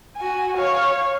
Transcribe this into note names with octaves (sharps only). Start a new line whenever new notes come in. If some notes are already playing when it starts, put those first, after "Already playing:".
F#4 G#5
C#5 F5